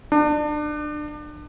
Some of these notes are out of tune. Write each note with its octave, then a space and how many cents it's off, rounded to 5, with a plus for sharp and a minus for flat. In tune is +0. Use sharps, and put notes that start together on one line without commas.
D4 +30